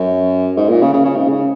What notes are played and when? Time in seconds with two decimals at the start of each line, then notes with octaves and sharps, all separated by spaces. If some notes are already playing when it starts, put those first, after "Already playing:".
Already playing: F#2
0.57 G#2
0.69 A#2
0.82 C#3
0.93 C#3
1.05 C#3
1.16 G#2
1.28 C#3